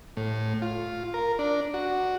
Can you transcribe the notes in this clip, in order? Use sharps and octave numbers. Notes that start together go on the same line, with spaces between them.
A2
F4
A#4
D4
F#4